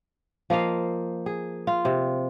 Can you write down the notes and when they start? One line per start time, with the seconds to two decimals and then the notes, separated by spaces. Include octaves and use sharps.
0.50 F3 A#3 D#5 F5
1.26 G#4
1.67 F4
1.85 C3